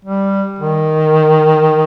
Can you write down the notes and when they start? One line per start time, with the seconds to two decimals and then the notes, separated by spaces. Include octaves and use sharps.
0.05 G3
0.59 D#3